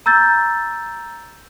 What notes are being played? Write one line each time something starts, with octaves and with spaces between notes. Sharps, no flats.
A#5 E6 G6 A6